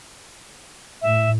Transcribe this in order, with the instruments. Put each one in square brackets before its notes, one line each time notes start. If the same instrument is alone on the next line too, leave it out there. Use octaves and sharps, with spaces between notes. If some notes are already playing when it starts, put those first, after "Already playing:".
[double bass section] A2 [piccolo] E5